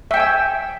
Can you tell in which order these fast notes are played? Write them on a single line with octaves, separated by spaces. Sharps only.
E5 G5 G#5 E6